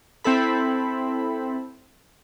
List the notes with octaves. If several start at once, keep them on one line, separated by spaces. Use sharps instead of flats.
C4 E4 A4 B5